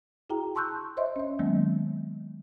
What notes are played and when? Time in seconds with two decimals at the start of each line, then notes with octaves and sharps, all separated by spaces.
0.30 E4 F#4 G#4 G5 A#5
0.55 A5 C6 C#6 E6 F#6 G6
0.97 C5 C#5 D#5 E5 C6
1.16 C#4 D#5
1.39 D#3 F#3 G#3 A#3 B3 C#4